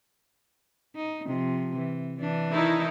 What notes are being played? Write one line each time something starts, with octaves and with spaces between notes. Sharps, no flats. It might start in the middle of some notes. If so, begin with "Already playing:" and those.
D#4
C3 F3
E3
E3 D4
D#3 D#4 E4